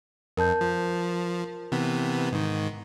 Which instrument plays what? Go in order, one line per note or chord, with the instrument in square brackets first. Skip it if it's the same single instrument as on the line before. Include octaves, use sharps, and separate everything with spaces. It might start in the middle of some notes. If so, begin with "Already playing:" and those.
[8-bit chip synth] F2 [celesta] A#4 A5 G6
[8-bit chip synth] F3
C3 E3 B3
G#2 D#3